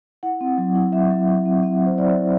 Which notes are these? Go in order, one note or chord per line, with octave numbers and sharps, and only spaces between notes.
E4 F#5
C4
F#3
E4
F#3 E5
F#3
E4
C4
C4 E5
F#3
C5
E4 D5
F#3